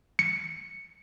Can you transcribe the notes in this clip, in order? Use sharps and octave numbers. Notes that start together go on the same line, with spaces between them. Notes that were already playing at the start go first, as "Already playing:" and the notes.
C#7